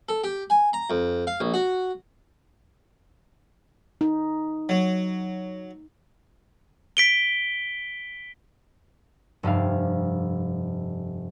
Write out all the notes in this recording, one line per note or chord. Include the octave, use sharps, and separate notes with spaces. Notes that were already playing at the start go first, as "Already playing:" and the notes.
A4
G4
G#5
A#5
F2
F5
A#1
F#4
D#4
F#3
B6 D7 G7
F1 G2 G3 F5